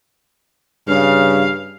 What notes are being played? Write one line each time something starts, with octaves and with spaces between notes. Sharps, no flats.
G2 C#3 F5